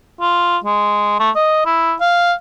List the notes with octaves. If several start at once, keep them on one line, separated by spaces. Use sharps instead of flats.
F4
G#3
A3
D#5
E4
F5